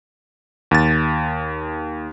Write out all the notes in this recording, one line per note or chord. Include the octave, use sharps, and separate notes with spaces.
D#2 A6